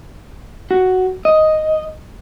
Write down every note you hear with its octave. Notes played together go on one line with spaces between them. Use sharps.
F#4
D#5